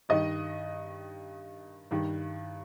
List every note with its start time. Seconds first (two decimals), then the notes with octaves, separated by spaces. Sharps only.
0.09 G2 D#3 D#5
1.91 G2 D#3